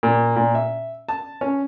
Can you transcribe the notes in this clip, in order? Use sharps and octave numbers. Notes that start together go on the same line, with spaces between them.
A#2
A#2
E5
A5
C#4